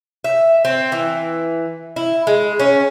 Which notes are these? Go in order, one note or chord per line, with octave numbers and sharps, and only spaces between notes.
E5
C4
E3
E4
G#3
C#4